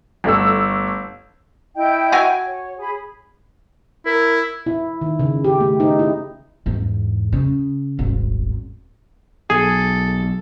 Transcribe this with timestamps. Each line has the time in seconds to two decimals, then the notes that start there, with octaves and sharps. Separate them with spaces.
0.24 G1 A3 E6
1.76 E4 D#5 G5
2.12 F#4 G#5
2.47 C#5
2.79 G#4 B5
4.06 E4 A#4
4.66 E4
5.01 D#3
5.19 C#3
5.44 G4
5.60 A3
5.80 D#4
5.99 E4
6.66 E2 G#2
7.33 C#3
7.99 D#1 G#1
9.50 B1 G#4 A4